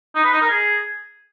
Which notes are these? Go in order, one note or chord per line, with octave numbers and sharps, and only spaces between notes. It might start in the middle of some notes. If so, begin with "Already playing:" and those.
D#4
B4
D#4
A#4
G#4